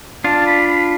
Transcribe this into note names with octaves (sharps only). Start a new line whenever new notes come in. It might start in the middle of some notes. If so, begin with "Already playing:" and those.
D4 F4 A5
B5
B5